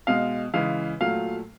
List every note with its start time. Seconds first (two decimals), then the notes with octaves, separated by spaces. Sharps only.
0.07 B2 G#3 F5
0.54 C#3 E3 G#3 F5
1.00 A#2 F#3 A3 F5